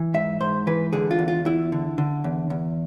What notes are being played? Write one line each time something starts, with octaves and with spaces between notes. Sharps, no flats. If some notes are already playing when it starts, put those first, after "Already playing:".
Already playing: E3
G#2 E5
G#2 C5
E3 B4
D3 G#4
F4
E2
F4
E2 E4
D3
D3
E2
E2